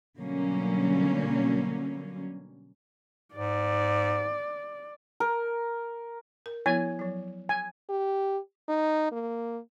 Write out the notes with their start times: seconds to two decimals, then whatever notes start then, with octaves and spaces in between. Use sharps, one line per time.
0.18 B2 D3 F#3 G3 A#3 C#4
3.35 G#2 D5
5.20 A#4
6.46 A#4
6.66 F3 B3 E4 G#5
6.99 F3 F#3
7.49 G#5
7.89 G4
8.68 D#4
9.12 A#3